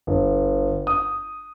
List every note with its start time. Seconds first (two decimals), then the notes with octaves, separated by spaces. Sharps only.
0.07 G1
0.87 D#6